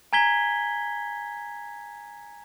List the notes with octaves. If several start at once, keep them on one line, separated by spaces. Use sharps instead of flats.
G#5 A#5 G#6 B6 G7